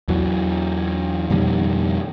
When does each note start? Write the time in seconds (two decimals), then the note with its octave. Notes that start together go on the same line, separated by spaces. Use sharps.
0.08 E2 E3 F#3
1.30 F2 B2 D#3 G3